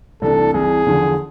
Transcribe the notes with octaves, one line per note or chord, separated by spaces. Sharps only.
C2 C3 E3 A3 D4 A4
C2 C3 E3 G#4
E2 D3 F3